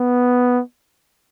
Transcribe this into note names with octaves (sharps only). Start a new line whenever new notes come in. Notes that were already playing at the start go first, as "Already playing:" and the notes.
Already playing: B3